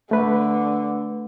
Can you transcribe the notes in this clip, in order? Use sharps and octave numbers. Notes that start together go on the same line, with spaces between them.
D3 A3 B4